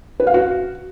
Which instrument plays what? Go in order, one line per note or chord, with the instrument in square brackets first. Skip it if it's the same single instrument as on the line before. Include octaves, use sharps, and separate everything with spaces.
[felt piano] B4
F5
F#4